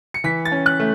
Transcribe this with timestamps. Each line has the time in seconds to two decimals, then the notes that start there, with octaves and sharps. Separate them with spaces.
0.14 C#7
0.24 E3 B6
0.45 A6
0.52 C#4
0.66 F#6
0.80 A3